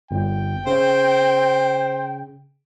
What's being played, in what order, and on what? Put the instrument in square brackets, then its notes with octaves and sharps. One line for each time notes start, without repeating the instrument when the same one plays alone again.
[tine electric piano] G1 [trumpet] G5
[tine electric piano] C#3 [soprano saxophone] C5